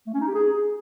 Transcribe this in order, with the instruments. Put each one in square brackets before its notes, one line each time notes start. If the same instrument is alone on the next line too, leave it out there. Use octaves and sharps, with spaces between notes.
[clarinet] A3
C#4
D#4
G4
G#4